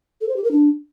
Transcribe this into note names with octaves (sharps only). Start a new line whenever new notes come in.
A4
C5
G4
A#4
D4